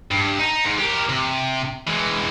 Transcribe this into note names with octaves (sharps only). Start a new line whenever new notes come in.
G2
D#4
G#2
G4 A#4
C3
E3 G#3